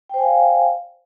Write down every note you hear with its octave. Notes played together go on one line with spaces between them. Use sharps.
C5 D5 F5 G5 G#5